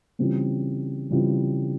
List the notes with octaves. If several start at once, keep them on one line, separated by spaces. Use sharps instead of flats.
C#3 E3 G3 C4 F4
C#3 E3 G3 C4 F4